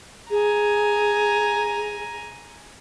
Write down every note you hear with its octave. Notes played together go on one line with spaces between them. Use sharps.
G#4 G#5 A#5